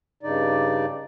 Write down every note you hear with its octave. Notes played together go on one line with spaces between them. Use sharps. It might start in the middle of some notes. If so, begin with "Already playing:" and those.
G2 C#3 D#4 D5